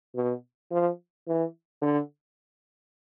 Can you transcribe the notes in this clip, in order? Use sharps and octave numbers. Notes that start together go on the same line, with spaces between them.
B2
F3
E3
D3